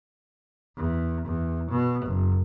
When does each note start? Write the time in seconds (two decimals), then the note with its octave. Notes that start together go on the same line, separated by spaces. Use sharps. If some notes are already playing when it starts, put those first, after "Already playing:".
0.77 E2
1.26 E2
1.71 B2
2.06 F#1